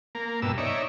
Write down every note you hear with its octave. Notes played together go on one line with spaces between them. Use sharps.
A#3
G2 B2 E6
D#4 C#5 D5 E5